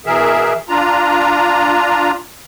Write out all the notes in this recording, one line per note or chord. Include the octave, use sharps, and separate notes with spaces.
B2 E3 G#4 A#4 E5
D4 F4 A#5